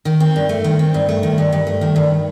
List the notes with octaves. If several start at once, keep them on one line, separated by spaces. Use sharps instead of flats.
D#3
C4
G2
A3
D#3
C4
G2
A3
D#3
G2
G2
A3
D#3
G2